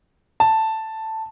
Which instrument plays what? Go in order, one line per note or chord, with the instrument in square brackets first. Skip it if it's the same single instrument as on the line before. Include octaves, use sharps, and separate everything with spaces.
[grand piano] A5